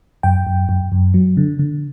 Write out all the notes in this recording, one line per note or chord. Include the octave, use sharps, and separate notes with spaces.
F#2 G5
F#2
F#2
F#2
F#3
D3
D3